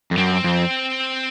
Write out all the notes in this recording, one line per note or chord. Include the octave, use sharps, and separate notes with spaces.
F2
F#2 C4
F2